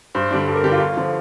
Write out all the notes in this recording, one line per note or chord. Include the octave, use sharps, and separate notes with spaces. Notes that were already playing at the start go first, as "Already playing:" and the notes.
G2 C5
D3 G3 D4
G2 A4
A#4
D3 G3 D4 G4
F4
G1
D3 F3